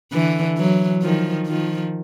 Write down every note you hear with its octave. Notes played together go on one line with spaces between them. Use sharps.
D3 E3
E3 F#3
D#3 F3
D#3 F3